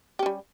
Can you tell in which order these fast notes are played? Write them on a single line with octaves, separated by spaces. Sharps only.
G4 C#4 G3